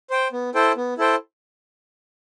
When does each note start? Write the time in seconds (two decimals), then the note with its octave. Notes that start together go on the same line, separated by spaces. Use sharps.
0.10 C5 G5
0.32 B3
0.55 E4 A4 C5 G5
0.76 B3
0.98 E4 A4 C5 G5